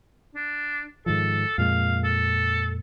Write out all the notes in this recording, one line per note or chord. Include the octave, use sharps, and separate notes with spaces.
D4
G#2 D#3 F3 A4
F2 A#2 G#3 F5
A4